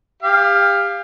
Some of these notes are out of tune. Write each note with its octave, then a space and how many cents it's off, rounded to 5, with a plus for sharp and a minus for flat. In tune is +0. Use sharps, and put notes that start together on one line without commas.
G4 +30 F5 +0